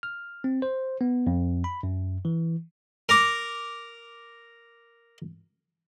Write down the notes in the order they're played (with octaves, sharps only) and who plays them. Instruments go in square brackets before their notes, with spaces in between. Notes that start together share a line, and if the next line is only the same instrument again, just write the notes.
[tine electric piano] F6
C4
C5
B3
F2
B5
F#2
E3
[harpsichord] A#4 A#5 D6